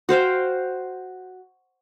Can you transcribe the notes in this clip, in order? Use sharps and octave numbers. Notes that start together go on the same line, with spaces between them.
F#4 C5 F5 G5